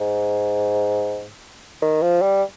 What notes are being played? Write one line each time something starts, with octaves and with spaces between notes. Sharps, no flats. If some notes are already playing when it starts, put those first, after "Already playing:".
G#2
D#3
F3
G3